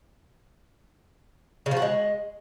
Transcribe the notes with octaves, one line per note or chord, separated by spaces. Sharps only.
C#3
F3
F#4
G#3